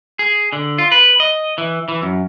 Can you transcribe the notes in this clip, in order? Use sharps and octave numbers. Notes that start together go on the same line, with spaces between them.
G#4
D3
F4
B4
D#5
E3
E3
F#2